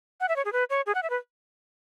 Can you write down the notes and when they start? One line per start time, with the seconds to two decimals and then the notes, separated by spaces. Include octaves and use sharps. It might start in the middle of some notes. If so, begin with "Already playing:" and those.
0.20 F#5
0.29 E5
0.36 C#5
0.45 G#4
0.53 B4
0.70 C#5
0.86 G#4
0.95 F#5
1.03 E5
1.10 B4